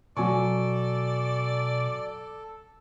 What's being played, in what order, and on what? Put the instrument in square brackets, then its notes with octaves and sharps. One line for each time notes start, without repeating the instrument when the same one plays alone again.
[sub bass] B2 [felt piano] F#3 G#5 C#6 [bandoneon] A4 [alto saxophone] D5